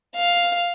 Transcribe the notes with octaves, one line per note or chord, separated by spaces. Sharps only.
F5